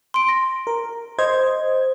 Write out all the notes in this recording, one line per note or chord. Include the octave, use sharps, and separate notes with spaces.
C6 D7
A#6
A#4
C5 D#5 G#6